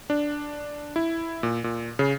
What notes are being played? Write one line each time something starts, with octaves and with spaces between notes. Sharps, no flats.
D4
E4
A#2
A#2
C#3